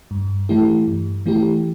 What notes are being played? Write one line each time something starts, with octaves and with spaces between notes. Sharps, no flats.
G2
E3 A3 E4 G4
G2
E3 A3 E4 G4